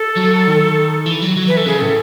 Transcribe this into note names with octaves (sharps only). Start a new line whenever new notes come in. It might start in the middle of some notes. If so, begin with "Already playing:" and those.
Already playing: A4
F#3
D#3
E3
F#3
F#3
E3 B4
A4
C#3 G#4
A2 A4